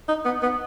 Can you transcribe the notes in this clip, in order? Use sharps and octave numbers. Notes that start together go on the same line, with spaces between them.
D#4
B3
B3